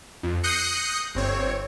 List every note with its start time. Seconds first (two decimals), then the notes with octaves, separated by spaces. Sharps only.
0.23 F2
0.43 D#6 F#6 G6 A#6 C7 C#7
1.15 G1 C4 C#5